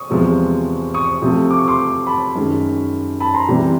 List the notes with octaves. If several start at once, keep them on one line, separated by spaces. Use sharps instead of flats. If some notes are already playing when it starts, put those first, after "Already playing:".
Already playing: C#6 D#6
E2 C3 F3 G#3
C#6 D#6
C3 F3 A3
D6
C#6
C6 D6
A5 B5
F#2 D#3 G#3
A5 B5
A#5 C6
C3 E3 G3